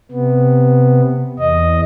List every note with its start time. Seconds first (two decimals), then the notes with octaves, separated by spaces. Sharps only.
0.11 C3 B3
1.39 E2 D#5